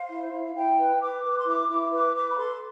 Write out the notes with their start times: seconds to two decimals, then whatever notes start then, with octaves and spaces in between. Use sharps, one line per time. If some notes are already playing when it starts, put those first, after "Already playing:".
Already playing: C5 F5
0.09 E4
0.33 E4
0.55 E4 G5
0.77 B4
1.00 B4 D6
1.23 B4
1.38 C6
1.46 E4 D6
1.68 E4 D6
1.91 B4 D6
2.14 B4 D6
2.30 B5
2.36 A4 C6